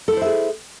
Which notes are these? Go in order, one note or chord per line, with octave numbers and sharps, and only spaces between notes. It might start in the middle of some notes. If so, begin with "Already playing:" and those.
E4 G#4 A4 C5 E5